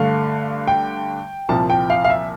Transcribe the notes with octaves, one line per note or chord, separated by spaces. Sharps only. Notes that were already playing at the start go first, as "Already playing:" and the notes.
Already playing: G2 D3 A3 F5
G5
C2 A#2 F3 A5
G5
F5
F5
E5